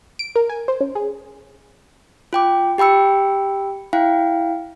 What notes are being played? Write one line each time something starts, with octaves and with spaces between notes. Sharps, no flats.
D7
A#4
G#5
C5
C#4
G#4
F4 G5 D6
G4 G5 B5 E6 C#7
E4 F5 G5